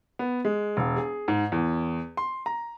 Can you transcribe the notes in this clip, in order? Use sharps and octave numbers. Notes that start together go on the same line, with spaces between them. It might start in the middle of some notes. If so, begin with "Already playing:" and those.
B3
G#3
E1
G#4
G#2
E2
C6
A#5